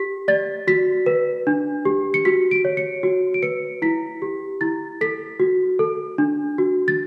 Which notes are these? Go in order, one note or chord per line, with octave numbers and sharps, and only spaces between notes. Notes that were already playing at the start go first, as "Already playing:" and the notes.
Already playing: G4 B6
D5 A6
F#4 B6
B4
D4
G4
C#7
F#4 B6
D7
C#5
C#7
F#4
D7
B4 C#7
E4 B6
G4
E4 A6
A4 B6
F#4
A4
D4
F#4
A6